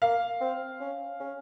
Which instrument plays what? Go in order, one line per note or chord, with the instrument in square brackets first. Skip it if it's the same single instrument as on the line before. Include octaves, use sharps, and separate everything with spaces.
[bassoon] A#3 [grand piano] F5
[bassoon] C4
C#4
C#4